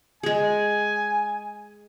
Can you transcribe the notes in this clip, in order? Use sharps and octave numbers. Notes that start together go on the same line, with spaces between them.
G#3 G#4 G#5